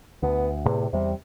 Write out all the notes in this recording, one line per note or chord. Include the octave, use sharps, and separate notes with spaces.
D2 B3
E2 A2 C3
E2 C3 G3